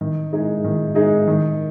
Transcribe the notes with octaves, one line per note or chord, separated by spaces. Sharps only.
D#3
G#3 D#4 G#4
D#3
G#3 D#4 G#4
D#3